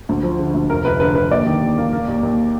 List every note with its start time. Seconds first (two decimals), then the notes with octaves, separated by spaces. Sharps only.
0.09 D2
0.23 F3
0.39 D3
0.54 D2
0.70 F1 A#4
0.85 F1 B4
1.00 D3 B4
1.15 D3 B4
1.31 D#2 D5
1.46 D#3
1.61 D#2
1.77 A#3
1.93 A#3
2.08 D#2
2.23 D#2